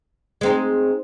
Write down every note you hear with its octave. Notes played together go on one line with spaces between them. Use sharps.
G#3 C4 D#4